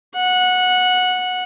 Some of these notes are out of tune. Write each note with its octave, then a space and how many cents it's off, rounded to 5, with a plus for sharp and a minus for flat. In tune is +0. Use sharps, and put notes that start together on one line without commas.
F#5 -15